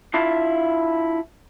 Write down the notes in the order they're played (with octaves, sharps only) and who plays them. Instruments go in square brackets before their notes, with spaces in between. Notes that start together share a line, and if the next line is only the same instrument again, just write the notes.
[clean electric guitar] D4 E4 F4 F5 A5